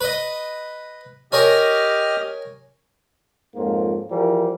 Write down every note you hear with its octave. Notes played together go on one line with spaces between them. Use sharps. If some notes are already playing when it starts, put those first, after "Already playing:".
B4 D#5
G4 A#4 C#5 D#5 G#5 F6
F2 G#2 F#3 A#3 F4
E3 F3 G3 G#4 A#4